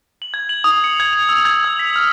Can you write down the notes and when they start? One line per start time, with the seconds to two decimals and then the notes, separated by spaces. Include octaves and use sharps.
0.22 F#7
0.34 G#6
0.49 F#7
0.64 D#6
0.84 C#7
1.00 G#6
1.13 F7
1.29 E6
1.45 G#6
1.64 E6
1.79 B6
1.96 F6